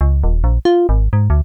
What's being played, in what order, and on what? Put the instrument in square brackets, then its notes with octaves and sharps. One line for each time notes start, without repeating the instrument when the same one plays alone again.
[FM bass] C#2
D#1
A#1
F4
G#1
G#2
D2